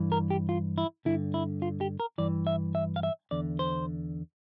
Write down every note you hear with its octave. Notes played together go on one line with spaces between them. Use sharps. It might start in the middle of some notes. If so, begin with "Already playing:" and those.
Already playing: G2 E3
A#4
G4
F4
E4
G2 D3 E4
E4
F4
G4
A#4
G2 E3 D5
E5
E5
F5
E5
E2 D3 D5
C5